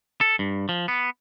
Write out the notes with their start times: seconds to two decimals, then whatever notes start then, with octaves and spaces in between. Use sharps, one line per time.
0.21 A4
0.39 G2
0.69 F3
0.88 B3